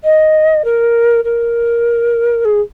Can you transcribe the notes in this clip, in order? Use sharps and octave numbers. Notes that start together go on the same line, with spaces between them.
D#5
A#4
A#4
G#4